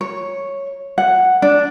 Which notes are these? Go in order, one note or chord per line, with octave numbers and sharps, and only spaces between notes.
C#5
F#5
D4